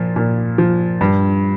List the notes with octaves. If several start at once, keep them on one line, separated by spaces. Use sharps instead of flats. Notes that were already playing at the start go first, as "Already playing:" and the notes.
Already playing: A#2 F3
A#2
F3
G2